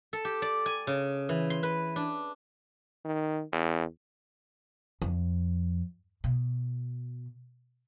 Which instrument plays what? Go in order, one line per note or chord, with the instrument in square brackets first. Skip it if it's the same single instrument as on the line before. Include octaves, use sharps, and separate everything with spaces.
[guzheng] A4
G4
D5
G#5
C#3
E3
C6
B4
D4
[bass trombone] D#3
E2
[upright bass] F2
B2